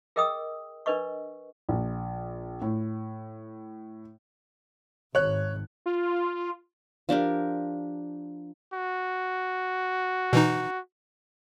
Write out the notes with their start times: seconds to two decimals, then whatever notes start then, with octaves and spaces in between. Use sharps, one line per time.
0.16 G#4 A#4 D#5 G5 D#6 E6
0.86 D4 A#4 B4 D#5 C#6
1.69 A#1
2.62 A2
5.15 G#1 C#5 F#6
5.86 F4
7.09 F3 D4 G4 A#4
8.73 F#4
10.33 B2 E3 D#4